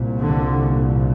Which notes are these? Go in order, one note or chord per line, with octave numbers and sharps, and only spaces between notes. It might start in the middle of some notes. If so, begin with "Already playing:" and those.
Already playing: C2 A#2
D3